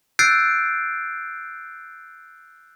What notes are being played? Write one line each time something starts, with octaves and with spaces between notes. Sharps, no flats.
E6 F#6 G6 A6 C7 D7